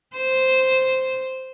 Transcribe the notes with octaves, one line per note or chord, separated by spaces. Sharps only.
C5